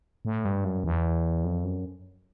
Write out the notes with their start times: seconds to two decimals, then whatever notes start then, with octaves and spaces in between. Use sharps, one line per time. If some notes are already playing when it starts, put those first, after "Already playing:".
0.25 A2
0.45 G2
0.65 F#2
0.84 E2
1.44 F2
1.64 F#2